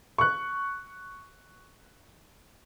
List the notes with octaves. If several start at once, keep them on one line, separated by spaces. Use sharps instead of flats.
C#6 F#6